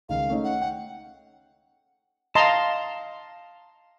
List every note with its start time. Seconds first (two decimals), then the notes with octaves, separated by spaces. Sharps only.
0.09 C#2 D#3 F5
0.28 A3 C#4 D#4
0.44 F#5
0.61 G5
2.35 D#5 F5 A5 A#5 C6